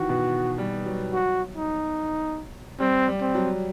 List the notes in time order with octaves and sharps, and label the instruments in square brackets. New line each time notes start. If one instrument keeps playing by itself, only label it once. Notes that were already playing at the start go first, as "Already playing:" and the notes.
Already playing: [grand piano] D#3 E3 [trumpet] F#4
[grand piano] B2
G3
F#3
[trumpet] F#4
D#4
[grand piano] G3 [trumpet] C4
[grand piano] G3
[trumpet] C4
[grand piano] F#3